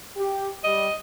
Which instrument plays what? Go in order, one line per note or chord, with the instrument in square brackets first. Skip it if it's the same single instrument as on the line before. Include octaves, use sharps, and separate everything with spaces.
[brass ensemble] G4
[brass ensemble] G3 [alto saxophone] D#5